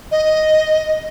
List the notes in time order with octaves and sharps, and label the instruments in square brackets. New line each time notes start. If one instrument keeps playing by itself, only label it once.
[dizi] D#5